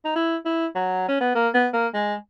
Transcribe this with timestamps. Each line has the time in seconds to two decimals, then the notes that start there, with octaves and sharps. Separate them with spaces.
0.05 D#4
0.16 E4
0.45 E4
0.75 F#3
1.08 C#4
1.21 B3
1.35 A#3
1.54 B3
1.73 A#3
1.94 G#3